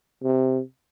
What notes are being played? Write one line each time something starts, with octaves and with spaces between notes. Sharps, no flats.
C3